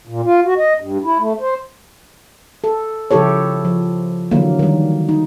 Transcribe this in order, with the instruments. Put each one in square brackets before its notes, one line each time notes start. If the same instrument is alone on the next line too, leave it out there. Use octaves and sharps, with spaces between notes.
[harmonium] A#2
F4
F#4
D#5
G2
E4
A3
C5
[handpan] A4
C#3 F3 E4 G4 A4 C#5
F3
D3 E3 F#3 A#3
D#3 G3
D#4